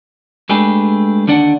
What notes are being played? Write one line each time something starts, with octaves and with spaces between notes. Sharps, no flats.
G#3 A3 D4 G4 G#4 B4
D#2 D3 D4 D5 F#5